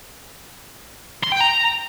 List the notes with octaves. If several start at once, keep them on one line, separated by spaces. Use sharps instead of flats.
C6
G5
A#5